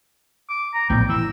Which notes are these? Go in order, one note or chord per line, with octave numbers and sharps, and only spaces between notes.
D6
A#5
A#1 A2 B3 G5
E3 E6